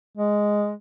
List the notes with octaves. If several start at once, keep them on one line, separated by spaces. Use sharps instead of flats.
G#3